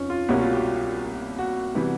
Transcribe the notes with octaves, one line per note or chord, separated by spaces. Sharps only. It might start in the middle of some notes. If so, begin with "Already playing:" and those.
Already playing: F1 F3 C#4
F4
C2 B2 G3 A#3 C#4 F#4
F4
G4
F#4
C3 E3 G3 B3